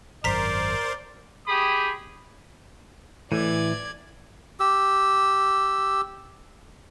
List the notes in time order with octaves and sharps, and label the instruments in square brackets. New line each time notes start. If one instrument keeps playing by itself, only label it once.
[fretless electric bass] G#1 F#2 [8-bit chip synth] A#4 C5 C6 [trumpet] D5 [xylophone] A#5 B6
[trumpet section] G4 G#4 B5 D#6
[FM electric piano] A2 [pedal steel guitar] E3 [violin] D5 G#6
[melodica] G4 E6